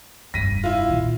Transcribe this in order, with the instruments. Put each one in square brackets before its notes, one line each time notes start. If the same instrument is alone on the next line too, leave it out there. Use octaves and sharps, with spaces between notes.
[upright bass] F1 G2 [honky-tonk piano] A#6 B6 D#7
[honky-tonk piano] E4 F4
[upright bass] A#2 D#3